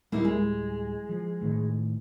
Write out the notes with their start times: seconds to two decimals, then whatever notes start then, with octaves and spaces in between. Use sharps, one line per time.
0.12 D1 G3 A#3 D#4 E4
0.25 G#3
1.09 F3
1.41 A1 A2 D#3